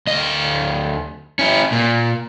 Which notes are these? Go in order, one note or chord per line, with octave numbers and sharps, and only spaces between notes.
D2 D#5
C#4 E4
A#2